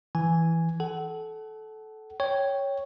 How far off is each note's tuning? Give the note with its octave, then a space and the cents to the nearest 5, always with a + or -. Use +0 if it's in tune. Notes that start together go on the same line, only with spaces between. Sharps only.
E3 +0 G#5 +0
A4 -20 F#5 +30
C#5 +0 G5 +0